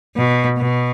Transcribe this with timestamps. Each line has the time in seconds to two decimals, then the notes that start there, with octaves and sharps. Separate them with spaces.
0.16 B2
0.57 B2